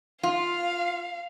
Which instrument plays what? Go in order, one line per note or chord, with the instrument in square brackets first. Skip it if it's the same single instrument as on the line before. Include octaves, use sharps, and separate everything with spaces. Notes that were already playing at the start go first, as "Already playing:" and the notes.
[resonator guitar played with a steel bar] F4 [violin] F5